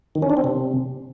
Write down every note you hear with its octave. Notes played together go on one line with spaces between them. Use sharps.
D#3
C#4
D4
C4
C3